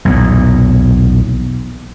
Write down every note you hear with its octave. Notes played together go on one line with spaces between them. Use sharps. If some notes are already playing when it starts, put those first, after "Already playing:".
B1 E2 A#2